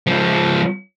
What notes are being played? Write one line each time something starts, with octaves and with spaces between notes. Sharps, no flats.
C#2 F3